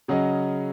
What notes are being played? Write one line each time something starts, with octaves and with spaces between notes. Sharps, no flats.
C#3 F#3 C#4 G#4 D#5